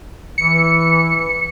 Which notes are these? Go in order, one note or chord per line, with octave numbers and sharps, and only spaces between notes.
E3 C#7